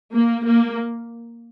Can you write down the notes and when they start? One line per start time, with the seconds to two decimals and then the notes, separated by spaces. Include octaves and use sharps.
0.13 A#3
0.46 A#3